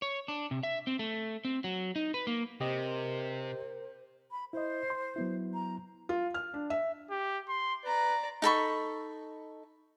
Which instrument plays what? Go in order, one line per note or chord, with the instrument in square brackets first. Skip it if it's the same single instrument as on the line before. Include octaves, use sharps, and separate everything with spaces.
[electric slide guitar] C#5
D4
C3
E5
C4
A3
C4
F#3
D#4
B4
A#3
[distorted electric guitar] C3 [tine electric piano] G4 D#5 [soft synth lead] A#4 [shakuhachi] C5
[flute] B5
[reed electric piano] E4 D#5 [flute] C5
[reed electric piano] C6
F#3 B3 E4
[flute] A#5
[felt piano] F4
F6
D4
E5
[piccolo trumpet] G4
C6
[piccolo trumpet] B4 [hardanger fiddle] D5 A#5
[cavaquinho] D#4 A4 B5 C#6